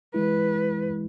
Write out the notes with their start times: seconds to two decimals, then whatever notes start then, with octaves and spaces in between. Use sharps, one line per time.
0.14 E3 G#3 E4 B4